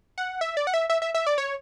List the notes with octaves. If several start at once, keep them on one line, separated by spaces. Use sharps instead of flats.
F#5
E5
D5
F#5
E5
E5
E5
E5
D5
C#5